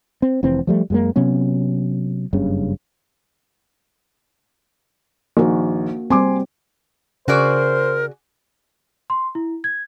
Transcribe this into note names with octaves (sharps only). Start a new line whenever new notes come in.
C4
F1 E3 C4
F3 G3 A3
F#2 G#3 A#3
C3 F#3 B3 C#4
F#1 G2 C#3
A#1 D#3 A#3 F#4
G3 C4 G#5 C6 D6
C#3 F#4 G#4 A#4 C5 D5
C6
E4
G#6